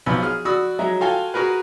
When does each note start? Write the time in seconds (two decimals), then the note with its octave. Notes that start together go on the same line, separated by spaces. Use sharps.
0.06 B1 F3 B3 G#5 B5 E6
0.22 G#4 F6
0.45 F#4 D5 B5 D#6 E6
0.79 F#3 G#3 E5 A#5
1.01 F4 F#4 A4 F5 G5 G#5
1.34 F#4 G#4 A#4 B4